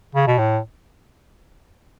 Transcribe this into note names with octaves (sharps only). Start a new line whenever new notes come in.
C#3
B2
A2